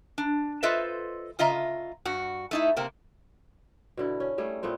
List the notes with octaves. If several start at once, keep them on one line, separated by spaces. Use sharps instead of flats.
D4
F4 A4 B4 C5 D#5 E5
C#3 F4 D#5 E5 A#5
G2 F#4
A3 D#4 E4
C3 A#3 C4
B2 D3 E4
C#4
G3 A3 G#4
A#2 A3 B3 C4